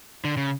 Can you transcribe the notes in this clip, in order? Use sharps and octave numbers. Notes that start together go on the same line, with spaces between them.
D3
C#3